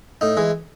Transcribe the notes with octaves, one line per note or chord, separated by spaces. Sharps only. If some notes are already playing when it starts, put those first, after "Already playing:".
A2 D#4
E3 G#3